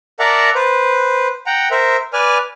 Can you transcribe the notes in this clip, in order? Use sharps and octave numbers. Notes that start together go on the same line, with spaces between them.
A#4 D5 E5 F#5 A5 A#5
B4 C5
F#5 G5 A#5
A#4 C5 E5
B4 D5 G#5 F6